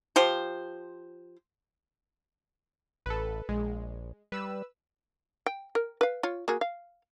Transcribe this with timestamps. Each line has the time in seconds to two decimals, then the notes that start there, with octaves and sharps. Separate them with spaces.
0.16 F3 G4 C5
3.06 A1 A4 B4
3.49 A#1 G#3
4.32 G3 B4 E6
5.46 G5
5.75 A#4
6.01 B4 F5
6.23 F4 C#5
6.48 A#3 F#4 G#4
6.61 F5